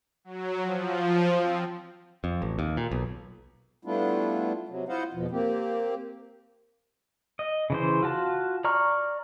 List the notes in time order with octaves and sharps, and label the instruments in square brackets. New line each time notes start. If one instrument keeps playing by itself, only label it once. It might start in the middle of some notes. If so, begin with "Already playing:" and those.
[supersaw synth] F#3
F3
C4
[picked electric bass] F2
A1
D#2
A#2
B1
[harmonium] G3 A3 B3 D4 E4 F4
C3 F#3
E4 F4 C5 D#5 F5 F#5
E2 B2 F3
A#3 C4 G4
[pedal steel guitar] D#5
C#3 E3 C5
F4 F#4 A5
D5 A#5 C#6 F6